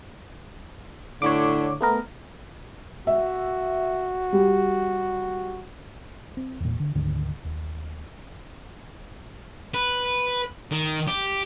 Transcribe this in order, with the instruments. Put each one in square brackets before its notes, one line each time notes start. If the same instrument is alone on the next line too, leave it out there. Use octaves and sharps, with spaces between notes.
[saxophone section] A2 D3 [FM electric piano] C#5 D6
[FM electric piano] A3 B3 A#4
[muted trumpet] F#4 [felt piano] E5
[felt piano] G3
[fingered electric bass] C4
E2 A#2
D3
D2 G#2 D3 D#3
D#2
[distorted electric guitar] B4
D#3
G4